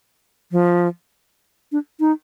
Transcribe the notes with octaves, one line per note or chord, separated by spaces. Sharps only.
F3
D4
D#4